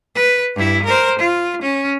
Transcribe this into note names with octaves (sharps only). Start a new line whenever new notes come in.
B4
G2 E4
A#4 C5
F4
C#4